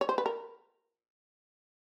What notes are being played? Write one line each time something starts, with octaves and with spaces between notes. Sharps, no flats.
C#5
C5
B4
A#4